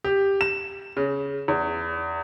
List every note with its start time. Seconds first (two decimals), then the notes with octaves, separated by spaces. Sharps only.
0.04 G4
0.41 E7
0.97 C#3
1.48 E2